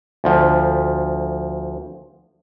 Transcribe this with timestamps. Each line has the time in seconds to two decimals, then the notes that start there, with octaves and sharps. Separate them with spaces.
0.24 D2 F3